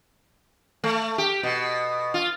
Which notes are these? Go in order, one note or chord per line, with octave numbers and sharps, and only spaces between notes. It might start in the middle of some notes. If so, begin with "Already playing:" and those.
A3
G4
B2
F4